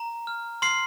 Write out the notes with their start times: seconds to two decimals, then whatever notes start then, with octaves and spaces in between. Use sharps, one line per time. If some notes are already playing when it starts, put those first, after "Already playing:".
Already playing: A#5
0.27 F6
0.62 C6 F6 C7